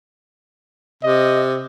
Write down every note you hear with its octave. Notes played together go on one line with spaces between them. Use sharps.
C3 D#5